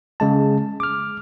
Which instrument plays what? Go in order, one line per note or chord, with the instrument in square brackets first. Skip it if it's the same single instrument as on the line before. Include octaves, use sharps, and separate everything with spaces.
[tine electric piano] C#3 G#3 A5
D6 F6